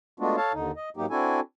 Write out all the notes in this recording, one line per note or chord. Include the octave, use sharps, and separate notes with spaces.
G#3 A3 B3 D4 F4 F#4
A4 C#5 F5 A5
D#2 D3 D#4
D#5
G#2 F#3 A#3 D#4 G4
C4 D4 E4 F#4 A4 G#5